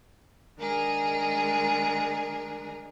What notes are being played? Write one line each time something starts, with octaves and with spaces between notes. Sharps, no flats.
D#3 G#3 D4 G#4 A#4